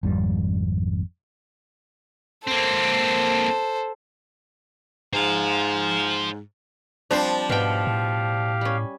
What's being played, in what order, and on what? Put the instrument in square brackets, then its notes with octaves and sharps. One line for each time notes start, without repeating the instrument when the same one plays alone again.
[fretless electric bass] G#1 F2 G3
[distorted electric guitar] A#3 C4 [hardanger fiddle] A4 C5
[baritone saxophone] G#2 [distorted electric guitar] C5 F5
[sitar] F3 D4 [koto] G3 C4 C5
[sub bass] G#2 [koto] B2 G5 [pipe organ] G4 F5
[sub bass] A2
[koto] G3 C#4